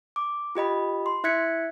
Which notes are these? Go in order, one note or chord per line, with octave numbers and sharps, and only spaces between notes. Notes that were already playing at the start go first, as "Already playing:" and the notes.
D6
F4 G4 D#5 B5
C6
E4 E5 F#6 G#6 B6 C#7